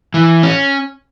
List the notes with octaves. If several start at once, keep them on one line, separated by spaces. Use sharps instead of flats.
E3
C#4